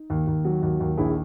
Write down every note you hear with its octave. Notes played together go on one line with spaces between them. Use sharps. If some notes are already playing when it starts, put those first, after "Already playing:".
Already playing: D#4
D#2
D#2
F#3
D#2
D#2
A#1 E4 G#4